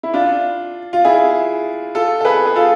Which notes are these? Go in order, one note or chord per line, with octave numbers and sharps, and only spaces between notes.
E4
D4 F4
F4
E4 G#4
F4 A4
A4
G#4 B4
G#4
F4 A4